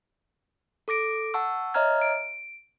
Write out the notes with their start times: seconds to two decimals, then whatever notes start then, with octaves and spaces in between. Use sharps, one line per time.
0.88 A4 D6 A#6 D7
1.34 F#5 A5 C#6 E6
1.74 C#5 D#5 E5 A#5 F6 G#6
2.02 D7